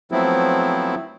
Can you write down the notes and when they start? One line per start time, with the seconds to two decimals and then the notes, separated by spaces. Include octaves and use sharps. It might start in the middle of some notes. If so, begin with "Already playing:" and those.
0.12 F3 F#3 A3 B3 C4 E4